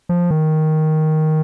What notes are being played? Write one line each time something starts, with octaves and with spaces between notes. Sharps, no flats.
F3
D#3